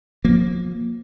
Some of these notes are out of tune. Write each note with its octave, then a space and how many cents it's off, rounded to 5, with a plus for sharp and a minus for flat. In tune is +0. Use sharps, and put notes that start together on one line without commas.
F3 +35 A#3 +0